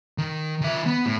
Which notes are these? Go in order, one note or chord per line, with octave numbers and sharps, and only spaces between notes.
D#3
D#3 E5
B3
A2